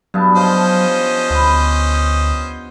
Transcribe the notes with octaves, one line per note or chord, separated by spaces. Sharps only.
G2 F#3 B3 A5
F3 C#4 C5 D#5
D2 B3